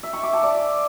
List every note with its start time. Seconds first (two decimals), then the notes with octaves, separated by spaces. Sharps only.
0.03 E5
0.13 C#6
0.23 D6
0.33 A5
0.43 D5